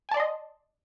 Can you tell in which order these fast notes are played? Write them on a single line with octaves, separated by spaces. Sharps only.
G#5 A5 D5 C6 D#5